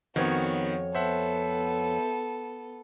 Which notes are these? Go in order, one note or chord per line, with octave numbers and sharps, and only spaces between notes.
F2 D#3 B3 F#4 C#5
B3 A4 C5 E5 F#5